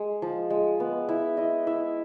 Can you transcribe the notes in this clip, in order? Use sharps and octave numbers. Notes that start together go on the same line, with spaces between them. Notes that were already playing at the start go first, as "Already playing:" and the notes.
Already playing: G#3
F3
G#3
B3
E4 E5
E4 D#5
E4 E5